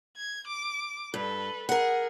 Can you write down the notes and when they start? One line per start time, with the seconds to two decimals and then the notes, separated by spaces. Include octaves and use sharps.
0.17 G#6
0.48 D6
1.14 G2 A4 B4
1.69 G#4 A#4 F#5